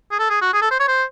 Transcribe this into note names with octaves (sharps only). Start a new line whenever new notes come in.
G#4
A4
G#4
F#4
G#4
A4
C5
C#5
C5